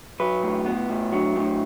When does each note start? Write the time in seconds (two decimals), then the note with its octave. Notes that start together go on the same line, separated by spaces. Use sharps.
0.20 F#3 B4
0.43 A2
0.66 B3
0.89 A2
1.12 F#3
1.36 A2